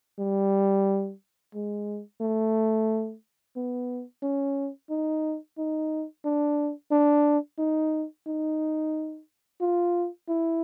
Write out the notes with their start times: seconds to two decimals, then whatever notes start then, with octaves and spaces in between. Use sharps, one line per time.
0.19 G3
1.55 G#3
2.21 A3
3.56 B3
4.23 C#4
4.90 D#4
5.58 D#4
6.25 D4
6.91 D4
7.59 D#4
8.27 D#4
9.61 F4
10.29 E4